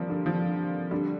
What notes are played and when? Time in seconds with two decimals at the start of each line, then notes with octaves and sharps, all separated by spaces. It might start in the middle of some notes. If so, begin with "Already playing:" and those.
Already playing: F3 G3 A#3 C4
0.10 D3
0.26 F3
0.91 D3 G3